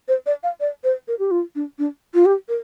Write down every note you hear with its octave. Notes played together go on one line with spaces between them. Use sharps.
C5
D5
F5
D5
C5
A#4
G4
F4
D4
D4
F4
G4
A#4